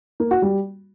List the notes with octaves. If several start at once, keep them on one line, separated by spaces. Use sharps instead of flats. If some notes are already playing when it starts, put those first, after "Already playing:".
A#3
F#4
G3